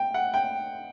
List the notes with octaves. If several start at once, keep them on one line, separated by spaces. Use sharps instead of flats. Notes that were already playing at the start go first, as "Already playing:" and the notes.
Already playing: G5
F#5
G5